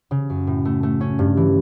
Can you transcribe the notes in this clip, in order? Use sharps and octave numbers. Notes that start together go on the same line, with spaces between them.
C#3
F#2
A2
A3
A3
C#4
G2
E3